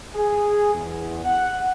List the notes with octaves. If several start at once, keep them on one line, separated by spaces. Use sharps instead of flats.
G#4
E2
F#5